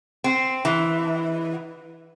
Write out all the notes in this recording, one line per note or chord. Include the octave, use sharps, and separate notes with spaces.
C4
E3